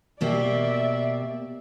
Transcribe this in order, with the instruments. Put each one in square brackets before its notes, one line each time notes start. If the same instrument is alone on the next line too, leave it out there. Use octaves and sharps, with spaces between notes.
[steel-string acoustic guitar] B2 A#3 G4 [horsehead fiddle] D5 E5